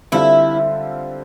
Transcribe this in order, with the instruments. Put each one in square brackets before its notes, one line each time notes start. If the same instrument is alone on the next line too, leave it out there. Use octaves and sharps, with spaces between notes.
[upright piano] D3 G3 C4 F4 A4 [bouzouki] E4